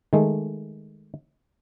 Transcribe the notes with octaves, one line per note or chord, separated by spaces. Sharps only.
D#3 G#3 A3